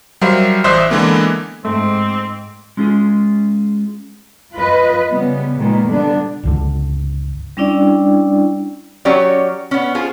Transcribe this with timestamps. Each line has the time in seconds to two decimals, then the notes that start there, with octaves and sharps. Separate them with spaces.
0.21 F#3 G3 A#4 C5 E5 F5
0.64 A1 C5 D5 E5 D#6 F#6
0.90 D3 E3 G#3 A#3 B3
1.65 G#2 A3 C4
2.77 G#3 C#4 F4 G#4
4.55 F4 B4 D#5
5.10 C#3 G3 B3
5.57 A#2 D#3 G#3 A#3 B3
5.88 D3 G3 B3 D4
6.44 G1 C#2 D3
7.57 G3 C#4 D4 E4 D5 G5
9.05 F#3 C#4 G4 C#5 D5
9.71 B3 C#4
9.95 F4 G#4 C5